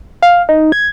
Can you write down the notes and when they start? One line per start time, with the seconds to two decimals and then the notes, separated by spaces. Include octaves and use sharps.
0.23 F5
0.49 D#4
0.72 G#6